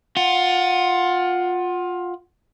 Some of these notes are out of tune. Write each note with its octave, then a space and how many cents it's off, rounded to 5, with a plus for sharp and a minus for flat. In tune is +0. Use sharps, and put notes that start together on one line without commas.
F4 +20 F#5 +5